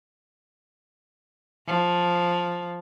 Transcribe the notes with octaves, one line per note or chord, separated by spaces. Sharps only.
F3